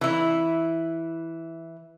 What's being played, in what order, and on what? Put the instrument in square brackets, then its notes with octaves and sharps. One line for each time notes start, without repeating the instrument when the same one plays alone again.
[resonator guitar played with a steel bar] E3 E4